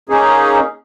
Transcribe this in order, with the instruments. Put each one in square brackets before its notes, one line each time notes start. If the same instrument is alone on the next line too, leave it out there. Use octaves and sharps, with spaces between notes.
[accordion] A#3 C#4 D#4 G#4